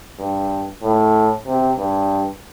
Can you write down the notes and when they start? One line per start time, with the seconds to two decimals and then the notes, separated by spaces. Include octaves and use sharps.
0.19 G2
0.82 A2
1.46 C3
1.78 G2